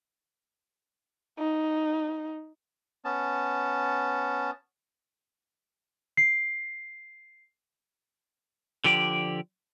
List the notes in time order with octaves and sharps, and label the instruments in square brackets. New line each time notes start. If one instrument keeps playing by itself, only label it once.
[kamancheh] D#4
[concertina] B3 C#4 A5
[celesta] C7
[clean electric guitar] D3 F3 G4 D5